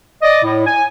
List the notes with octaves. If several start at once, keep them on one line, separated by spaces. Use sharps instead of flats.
D5 D#5
A2
G#5